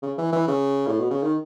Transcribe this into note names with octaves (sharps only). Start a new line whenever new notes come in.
C#3
E3
E3
C#3
A2
B2
C#3
D#3